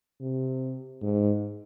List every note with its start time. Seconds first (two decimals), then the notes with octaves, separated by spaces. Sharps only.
0.21 C3
1.02 G#2